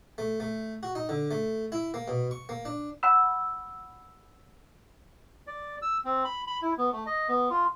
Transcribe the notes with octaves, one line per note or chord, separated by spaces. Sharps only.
A3
A3
F#4
D#4
D3
A3
E4
A#3
B2
C#6
A#3
D4
F#5 B5 E6
D5
E6
C4
B5
B5
E4
B3
A3
D#5
B3
F4